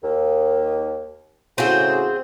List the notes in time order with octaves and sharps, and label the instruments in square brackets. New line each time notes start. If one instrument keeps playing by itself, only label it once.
[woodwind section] D#2
[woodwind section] A2 C#3 F#4 [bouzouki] C4 G#4 C5